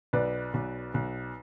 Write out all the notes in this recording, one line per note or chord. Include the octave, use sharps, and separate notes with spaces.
B1 B4 D5
B1
B1